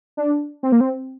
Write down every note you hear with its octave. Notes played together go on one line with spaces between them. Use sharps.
D4
C4
A#3
C4